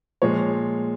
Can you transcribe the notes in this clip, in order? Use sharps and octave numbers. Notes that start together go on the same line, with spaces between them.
A#2 F3 G#3 C#5